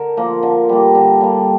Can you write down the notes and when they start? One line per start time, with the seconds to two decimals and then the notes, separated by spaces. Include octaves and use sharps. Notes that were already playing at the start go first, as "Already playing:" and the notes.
Already playing: D3 A#4
0.17 F3 A#3
0.43 D3
0.69 G3 A#3
0.95 D3
1.21 G3 A#3